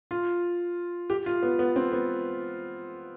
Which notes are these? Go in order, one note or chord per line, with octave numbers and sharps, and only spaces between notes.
F4
G4
F4
B3
B3
C4
B3